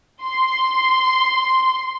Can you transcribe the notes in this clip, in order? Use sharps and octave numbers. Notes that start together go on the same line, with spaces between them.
C6